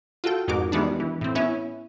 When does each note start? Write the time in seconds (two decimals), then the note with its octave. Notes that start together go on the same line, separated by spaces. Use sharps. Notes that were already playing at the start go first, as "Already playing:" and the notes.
0.24 F4 F#4 A4 G5
0.48 F2 G#2 F#4 G#4 A#4 D6
0.72 D#3 E3 G3 G#3 B3 D4
1.00 E3
1.21 A2 C4
1.35 B3 C#4 E4 E5